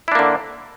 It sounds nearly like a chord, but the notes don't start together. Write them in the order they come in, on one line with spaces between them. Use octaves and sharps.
E4 D4 A#3 D3